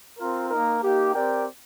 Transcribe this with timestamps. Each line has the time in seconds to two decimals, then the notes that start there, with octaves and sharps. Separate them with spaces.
0.19 C4 F4 A#4
0.50 A#3 D#4 A#4
0.82 A#3 D#4 G4
1.14 C4 G4 A#4 D5 G5